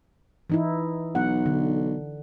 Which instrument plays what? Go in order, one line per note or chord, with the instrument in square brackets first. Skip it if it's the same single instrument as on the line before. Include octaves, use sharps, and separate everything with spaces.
[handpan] E3 D#4 E4
[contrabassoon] B1 [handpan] F#5
[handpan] D3